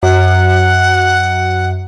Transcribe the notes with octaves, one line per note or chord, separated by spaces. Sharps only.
F#2 F#5